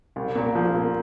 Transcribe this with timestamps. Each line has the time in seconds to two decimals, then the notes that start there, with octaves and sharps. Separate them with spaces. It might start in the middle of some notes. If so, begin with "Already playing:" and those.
0.16 C2
0.36 A#2
0.55 F3
0.74 A#2